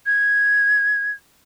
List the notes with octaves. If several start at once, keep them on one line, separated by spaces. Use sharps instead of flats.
G#6